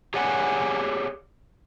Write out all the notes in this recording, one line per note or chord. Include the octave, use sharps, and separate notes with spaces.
G4 G#4 C#5 D5 F#5 G#5